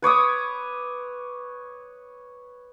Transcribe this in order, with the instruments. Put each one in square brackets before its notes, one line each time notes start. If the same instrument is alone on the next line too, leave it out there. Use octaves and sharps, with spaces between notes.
[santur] B4 C#5 D6 D#6